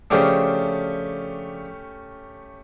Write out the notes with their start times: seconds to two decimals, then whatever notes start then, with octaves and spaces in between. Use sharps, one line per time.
0.11 C#3 F3 A3 C#4 D4 G4